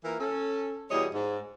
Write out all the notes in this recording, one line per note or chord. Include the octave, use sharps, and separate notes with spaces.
E3 A#3 F4 A#4
C#4 A4
E2 B2 G3 G#4 C#5 D#5
G#2